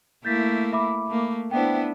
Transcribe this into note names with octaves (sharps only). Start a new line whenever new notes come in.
A3 A#3 E4 G6 A6 B6
E5 B5 D6
A3 A#3
B3 D4 E4 C5 E5 G5